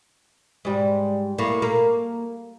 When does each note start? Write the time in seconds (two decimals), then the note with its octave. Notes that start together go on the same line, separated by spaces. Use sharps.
0.65 G#2 G3
1.38 A2 A#3
1.62 A#3